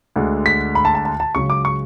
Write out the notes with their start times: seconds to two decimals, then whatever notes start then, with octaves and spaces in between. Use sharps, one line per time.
0.16 D2 D3 G#3
0.46 B6
0.75 B5
0.85 A5
0.95 A5
1.05 A5
1.20 A5
1.35 C#2 C#3 F#3 C#6
1.50 D6
1.65 C#6